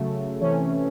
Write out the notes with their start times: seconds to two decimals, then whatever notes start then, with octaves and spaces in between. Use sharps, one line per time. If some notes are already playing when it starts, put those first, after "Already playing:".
Already playing: C#3 F#3 A3
0.41 C3 E3 A3 C#4